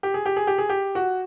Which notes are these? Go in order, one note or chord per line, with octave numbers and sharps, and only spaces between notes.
G4
G#4
G4
G#4
G4
G#4
G4
F#4